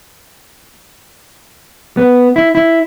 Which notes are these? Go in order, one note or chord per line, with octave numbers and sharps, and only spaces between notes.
B3
E4
E4